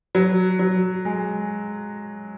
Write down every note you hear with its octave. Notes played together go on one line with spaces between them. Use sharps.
F#3
F#3
G#3